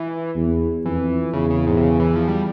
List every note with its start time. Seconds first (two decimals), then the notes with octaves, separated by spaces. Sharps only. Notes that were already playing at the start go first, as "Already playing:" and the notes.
Already playing: E3
0.35 E2
0.85 F2 E3
1.33 E2 C#3
1.50 C#3
1.67 G#2
1.77 C3
1.83 C#3
2.00 E3
2.16 F3
2.28 G3